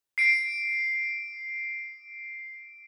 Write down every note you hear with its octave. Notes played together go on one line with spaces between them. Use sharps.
C7 D7